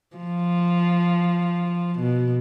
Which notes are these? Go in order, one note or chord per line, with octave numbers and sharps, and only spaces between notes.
F3
B2